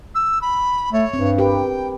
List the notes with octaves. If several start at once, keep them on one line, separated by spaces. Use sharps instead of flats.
E6
B5
A3 C#5
G2 C4
G4 A#4 B4 G5